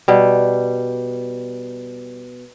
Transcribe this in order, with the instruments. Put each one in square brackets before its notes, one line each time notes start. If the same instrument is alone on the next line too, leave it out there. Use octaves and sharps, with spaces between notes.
[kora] B2 G3